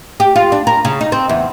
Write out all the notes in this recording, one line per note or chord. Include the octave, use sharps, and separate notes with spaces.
G4
F4
D4
A#4
C#3
D#4
C4
E2